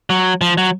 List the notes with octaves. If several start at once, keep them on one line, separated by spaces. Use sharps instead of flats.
F#3
F3
F#3